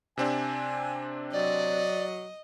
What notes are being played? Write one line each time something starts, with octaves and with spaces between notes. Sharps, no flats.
C3 C4 D4 G#5
F#3 D5 D#5